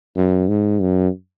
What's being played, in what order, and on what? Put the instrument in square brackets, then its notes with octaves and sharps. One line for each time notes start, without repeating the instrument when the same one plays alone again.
[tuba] F#2
G#2
F#2